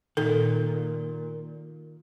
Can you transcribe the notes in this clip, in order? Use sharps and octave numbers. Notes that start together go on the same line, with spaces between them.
A#2 D#3 A4